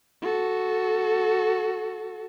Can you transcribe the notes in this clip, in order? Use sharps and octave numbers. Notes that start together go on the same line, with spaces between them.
F#4 A4